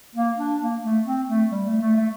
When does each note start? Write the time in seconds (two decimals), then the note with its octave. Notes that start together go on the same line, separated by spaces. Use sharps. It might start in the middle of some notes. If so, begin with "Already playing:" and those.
0.15 A#3
0.38 D4
0.61 A#3
0.83 A3
1.06 C4
1.28 A3
1.51 G3
1.66 A3
1.81 A3
1.95 A3